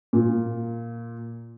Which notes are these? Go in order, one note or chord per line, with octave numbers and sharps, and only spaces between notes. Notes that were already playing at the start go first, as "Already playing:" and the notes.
A#2